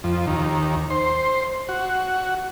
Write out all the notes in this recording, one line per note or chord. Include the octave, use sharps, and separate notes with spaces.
F2
D#2
C5
F#4